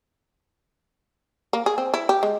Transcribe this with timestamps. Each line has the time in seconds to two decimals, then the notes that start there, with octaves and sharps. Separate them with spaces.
1.53 A#3
1.66 G#4
1.78 C4
1.94 E4
2.09 G4
2.23 G#3